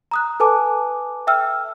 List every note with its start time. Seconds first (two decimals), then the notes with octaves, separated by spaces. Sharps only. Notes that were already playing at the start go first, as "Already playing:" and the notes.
0.11 A#5 D#6 F#6
0.40 A4 B4 G#5 A5 D6
1.27 E5 G5 E6 F6